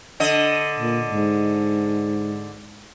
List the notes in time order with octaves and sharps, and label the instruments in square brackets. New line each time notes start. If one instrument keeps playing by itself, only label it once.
[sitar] D3 D#5
[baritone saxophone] A#2
G#2